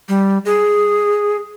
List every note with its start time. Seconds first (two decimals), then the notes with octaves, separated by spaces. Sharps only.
0.09 G3
0.45 G#4